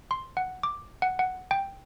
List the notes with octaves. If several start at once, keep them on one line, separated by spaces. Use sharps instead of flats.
C6
F#5
D6
F#5
F#5
G5